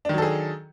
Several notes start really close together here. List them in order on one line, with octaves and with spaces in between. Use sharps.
D4 D#3 F#3 A4 G#4